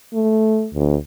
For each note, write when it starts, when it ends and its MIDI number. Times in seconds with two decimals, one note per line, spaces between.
0.13 0.67 57
0.73 0.96 38